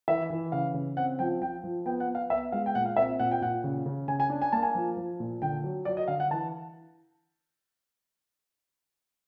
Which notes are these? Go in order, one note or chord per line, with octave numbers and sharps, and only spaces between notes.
E3 E5
E3
C#3 F5
C#3
C4 F#5
F3 G5
F3 G5
F3
B3 G5
F#5
B3
F5
B3 E5
G#3 F5
G5
A#2 F#5
F5
C4 E5
A#2 F#5
G5
A#2 F#5
C#3
C#3
C#3 G#5
G#5
D4
G#5
A#3 A5
G#5
F3
F3
A#2
D3 G5
F#3
F#3 D5
D#5
D3 F5
F#5
E3 A5